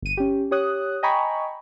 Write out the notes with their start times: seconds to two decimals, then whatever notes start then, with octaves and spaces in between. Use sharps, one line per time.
0.02 G1 D#7
0.17 C#4 G4
0.51 G4 C#5 D#6 F#6
1.03 D#5 G5 G#5 A#5 B5 C#6